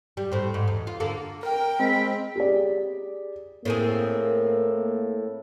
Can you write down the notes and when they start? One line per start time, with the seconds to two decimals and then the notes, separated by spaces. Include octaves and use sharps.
0.17 G3
0.32 A2 C4
0.54 G#2
0.68 E2
0.87 F4
1.00 D3 A#3 A4
1.43 A#4 G5
1.80 G#3 C4 B5
2.36 G4 G#4 D5
3.65 A2 A#3 C4 G#4